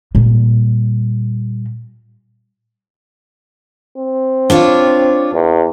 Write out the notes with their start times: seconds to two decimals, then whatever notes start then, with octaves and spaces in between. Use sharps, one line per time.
0.15 A#2 G3
3.97 C4
4.50 D4 F4 C#5
5.34 E2